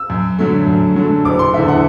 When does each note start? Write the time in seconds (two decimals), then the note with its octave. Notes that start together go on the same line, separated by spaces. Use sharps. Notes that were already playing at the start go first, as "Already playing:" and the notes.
Already playing: E6
0.10 F#2
0.39 D3 F#3 A3
0.67 F#2
0.96 D3 F#3 A3
1.25 F#1 D6
1.39 C6
1.53 E2 D3 E5
1.68 F#5